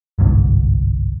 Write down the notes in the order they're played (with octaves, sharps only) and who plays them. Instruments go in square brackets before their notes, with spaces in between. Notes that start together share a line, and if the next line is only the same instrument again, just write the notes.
[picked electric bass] G1 C2 G#2